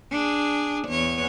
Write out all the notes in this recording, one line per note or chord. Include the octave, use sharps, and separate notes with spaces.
D4 G#4
E2 C#5